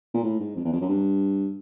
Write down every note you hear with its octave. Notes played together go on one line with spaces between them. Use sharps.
A#2
A2
G#2
F2
E2
F2
F#2
G2